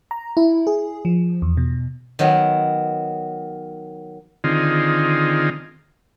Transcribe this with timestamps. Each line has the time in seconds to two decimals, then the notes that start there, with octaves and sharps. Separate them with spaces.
0.11 A#5
0.37 E4
0.67 G#4
1.05 F3
1.42 E2
1.57 B2
2.19 D#3 F#3 B3
4.44 D3 D#3 C4 D#4 F4 G#4